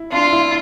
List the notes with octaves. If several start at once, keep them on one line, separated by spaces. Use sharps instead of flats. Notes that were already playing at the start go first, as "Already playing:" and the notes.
Already playing: E4
D4 F4
E4